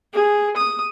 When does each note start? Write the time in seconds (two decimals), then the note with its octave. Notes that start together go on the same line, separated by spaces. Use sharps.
0.14 G#4
0.57 D#6